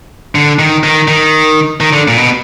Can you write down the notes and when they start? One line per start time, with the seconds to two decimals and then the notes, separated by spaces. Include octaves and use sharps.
0.35 D3
0.59 D#3
0.84 D#3
1.08 D#3
1.81 D#3
1.93 D3
2.08 A#2
2.17 B2